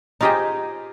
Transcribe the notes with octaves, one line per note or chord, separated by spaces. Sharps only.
D#4 F4 G4 G#4 C5 D#5